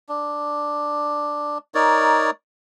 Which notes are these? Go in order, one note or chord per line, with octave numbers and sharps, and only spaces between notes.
D4
D#4 A#4 C#5 D5